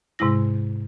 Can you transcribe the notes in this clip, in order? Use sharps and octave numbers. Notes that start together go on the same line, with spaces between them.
G#2 C3 G#3 E4 A#6